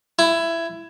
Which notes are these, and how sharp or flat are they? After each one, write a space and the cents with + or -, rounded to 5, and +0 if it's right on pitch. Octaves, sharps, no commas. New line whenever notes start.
E4 +15